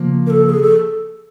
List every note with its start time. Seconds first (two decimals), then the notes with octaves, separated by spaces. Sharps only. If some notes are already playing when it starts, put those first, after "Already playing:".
Already playing: C#3 F3 A#3
0.26 A#4
0.30 A4
0.49 G#4
0.62 A4